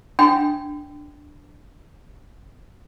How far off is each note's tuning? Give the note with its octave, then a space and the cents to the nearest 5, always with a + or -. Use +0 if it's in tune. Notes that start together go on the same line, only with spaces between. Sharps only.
D4 +0 G5 -5 C6 -45